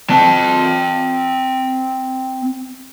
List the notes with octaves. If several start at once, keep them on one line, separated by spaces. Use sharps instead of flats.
C4 A5